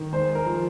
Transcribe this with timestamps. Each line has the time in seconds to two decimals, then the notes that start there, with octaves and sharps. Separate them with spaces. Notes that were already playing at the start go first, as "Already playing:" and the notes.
Already playing: D#3
0.13 G#3 C5
0.35 A#4
0.46 F3